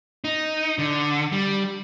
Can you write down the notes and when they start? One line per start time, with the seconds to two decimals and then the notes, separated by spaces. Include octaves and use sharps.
0.24 D#4
0.78 D3
1.32 G3